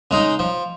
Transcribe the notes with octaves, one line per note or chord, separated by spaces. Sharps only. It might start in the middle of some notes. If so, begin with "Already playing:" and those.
C#3 G#3 D#4
F3